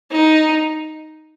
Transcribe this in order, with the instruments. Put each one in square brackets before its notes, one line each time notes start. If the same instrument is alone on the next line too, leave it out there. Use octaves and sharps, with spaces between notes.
[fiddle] D#4